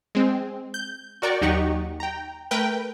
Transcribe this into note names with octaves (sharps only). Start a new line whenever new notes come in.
G#3 C4
G6
F#4 A#4 D5 G5 A#5 C#6
D#2 F#3 D#4 G4 F#5 C#6
G5 A#5
A3 A#4 B4 G5